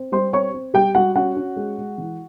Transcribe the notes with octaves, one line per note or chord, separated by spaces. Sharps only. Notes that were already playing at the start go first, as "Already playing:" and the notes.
Already playing: C4
G3 C5 C6
C4 C#5 C#6
C4
G3 G4 G5
G3 F#4 F#5
C#4 F#4 F#5
C#4
G#3
G#3
E3